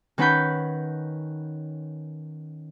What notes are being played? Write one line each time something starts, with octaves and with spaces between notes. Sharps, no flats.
D#3 C#4 B4 F#5 B5 G6